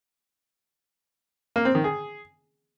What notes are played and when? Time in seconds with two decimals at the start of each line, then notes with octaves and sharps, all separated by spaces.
1.56 A#3
1.65 C4
1.75 D#3
1.84 G#4